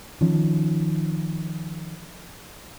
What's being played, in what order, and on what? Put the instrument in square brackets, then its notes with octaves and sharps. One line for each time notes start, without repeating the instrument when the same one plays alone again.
[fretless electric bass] D#3 F3 C#4